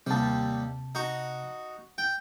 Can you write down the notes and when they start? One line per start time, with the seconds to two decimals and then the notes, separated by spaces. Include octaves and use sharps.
0.07 D#2 C3 G3 A5
0.95 D#4 F#4
1.98 G5